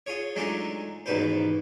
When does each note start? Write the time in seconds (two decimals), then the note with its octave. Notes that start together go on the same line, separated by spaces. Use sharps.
0.06 F4 G#4 C#5
0.36 F#3 G#3 A3 D4 D#4 F4
1.06 A1 D#2 G#2 B2 B4 C5